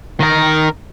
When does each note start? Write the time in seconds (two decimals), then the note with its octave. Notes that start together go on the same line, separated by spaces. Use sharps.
0.20 D#3 A#4